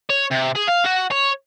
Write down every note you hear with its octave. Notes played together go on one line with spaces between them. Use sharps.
C#5
C3
G#4
F5
F#4
C#5